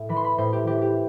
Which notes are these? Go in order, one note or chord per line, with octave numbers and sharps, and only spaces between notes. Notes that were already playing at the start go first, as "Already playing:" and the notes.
Already playing: A2
E3 B5
C6
B5
A2 C5
G4
E3 G4
G4